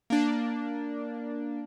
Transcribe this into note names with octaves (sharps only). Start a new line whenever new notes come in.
A#3 D4